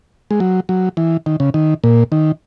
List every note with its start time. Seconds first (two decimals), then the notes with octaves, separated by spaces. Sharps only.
0.31 G#3
0.40 F#3
0.69 F#3
0.97 E3
1.26 D#3
1.40 C#3
1.54 D#3
1.84 A#2
2.12 D#3